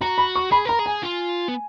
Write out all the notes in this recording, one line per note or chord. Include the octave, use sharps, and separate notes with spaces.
F#4 A#5
B5
C#6
G#4 B5
A#4 A#5
G#4
G#5
F4
B3